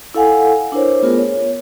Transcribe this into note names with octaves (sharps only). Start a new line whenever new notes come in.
E4 A4 F5 F#5 G#5
D4 E4 A#4 C5 C#5
A3 B3 F4 G#4 A#4
C#5